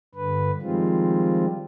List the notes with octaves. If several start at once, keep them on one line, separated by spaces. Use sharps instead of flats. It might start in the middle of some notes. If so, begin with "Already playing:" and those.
G2 D3 B4
D#3 F3 G3 G#3 C4 F4